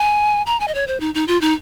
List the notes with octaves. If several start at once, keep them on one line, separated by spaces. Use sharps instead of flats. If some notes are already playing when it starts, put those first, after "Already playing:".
Already playing: G#5
A#5
G#5
D#5
C#5
C5
D#4
D#4
F4
D#4